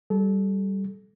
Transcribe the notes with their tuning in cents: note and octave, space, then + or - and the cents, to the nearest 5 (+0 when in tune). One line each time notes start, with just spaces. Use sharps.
G3 -15 A4 -25